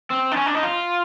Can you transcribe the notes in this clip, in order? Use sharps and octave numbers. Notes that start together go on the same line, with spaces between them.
C4
D4
C#4
D4
D#4
F4